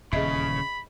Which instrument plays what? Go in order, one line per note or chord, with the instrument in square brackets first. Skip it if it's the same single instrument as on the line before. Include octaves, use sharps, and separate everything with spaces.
[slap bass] D#1 E2 [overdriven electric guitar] C#3 [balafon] G#4 D#5 E5 [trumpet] B5